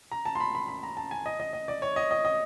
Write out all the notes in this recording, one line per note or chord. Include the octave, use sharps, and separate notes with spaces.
A#5
A5
C6
B5
B5
B5
A#5
A5
G#5
D#5
D#5
D#5
D5
C#5
D#5
D#5
D#5